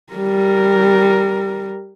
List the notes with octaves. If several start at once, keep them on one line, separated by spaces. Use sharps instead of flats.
G3 A#4